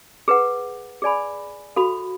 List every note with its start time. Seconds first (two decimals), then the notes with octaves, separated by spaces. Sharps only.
0.28 G#4 B4 F#5
1.02 G#4 D5 G#5 B5
1.76 F#4 A4 F5 B5